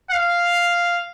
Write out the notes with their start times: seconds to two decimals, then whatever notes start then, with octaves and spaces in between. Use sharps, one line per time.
0.11 F5